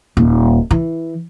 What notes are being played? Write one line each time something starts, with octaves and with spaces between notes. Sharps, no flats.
D#1
E3